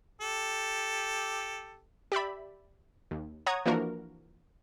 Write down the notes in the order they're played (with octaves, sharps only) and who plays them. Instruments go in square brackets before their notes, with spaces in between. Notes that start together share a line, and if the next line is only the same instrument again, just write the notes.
[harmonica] G4 A4
[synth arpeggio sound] G4 D5 E5 B5
D#2
C#5 F#5 A#5 D#6 G#6
E3 F3 A#3 D4 F#4 A#4